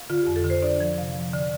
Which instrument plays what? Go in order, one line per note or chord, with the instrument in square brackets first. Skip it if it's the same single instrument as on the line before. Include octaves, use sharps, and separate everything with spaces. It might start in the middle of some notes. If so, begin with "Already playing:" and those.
Already playing: [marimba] F5
D3 F4
F2 G4
A4
D3
C5
D4 D5
F3
C3 F5
F3
D3 D5